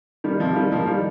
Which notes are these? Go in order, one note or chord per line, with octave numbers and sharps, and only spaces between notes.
D#3 G3
C3 F3
D#3 G3
F3 A#3
D#3 G3